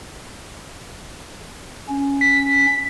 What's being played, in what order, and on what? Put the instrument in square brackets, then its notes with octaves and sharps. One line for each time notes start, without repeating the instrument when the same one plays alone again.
[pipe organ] C#4
[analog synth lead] B6